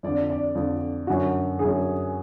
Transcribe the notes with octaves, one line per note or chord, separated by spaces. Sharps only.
F2 D3 D5
D5
F2 D3
F#2 D3 F#4
D3 G#4
F#2